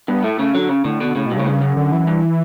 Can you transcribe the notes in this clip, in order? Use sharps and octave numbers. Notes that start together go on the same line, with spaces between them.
G2 B3
A2 A3
C#3
D3 F#3
C#3
A2 D3
B2
A2 C#3
G2 B2
A2 C#3
G2
F#2
D3
E3
G2